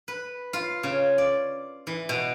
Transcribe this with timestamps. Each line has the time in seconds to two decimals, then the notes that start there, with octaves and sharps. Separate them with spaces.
0.08 B4
0.53 F4
0.83 C#3
1.18 D5
1.87 E3
2.09 B2